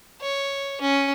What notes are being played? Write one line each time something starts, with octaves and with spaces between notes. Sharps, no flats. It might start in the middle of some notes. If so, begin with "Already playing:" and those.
C#5
C#4